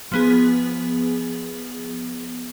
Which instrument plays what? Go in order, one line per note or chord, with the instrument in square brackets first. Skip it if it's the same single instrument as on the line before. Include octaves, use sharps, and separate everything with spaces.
[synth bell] F3 B3 G#4